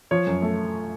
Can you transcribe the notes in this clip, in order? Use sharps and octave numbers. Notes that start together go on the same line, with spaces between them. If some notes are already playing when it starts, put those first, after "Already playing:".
F3 C#5
F#2
A3